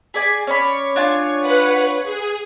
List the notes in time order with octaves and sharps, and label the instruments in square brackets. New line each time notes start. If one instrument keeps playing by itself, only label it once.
[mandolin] G#4 D5 G#5 [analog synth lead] B6
[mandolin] C#4 D5 B5 [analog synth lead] C#5
[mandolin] D4 F4 G#5
[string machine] B4 F#5
G#4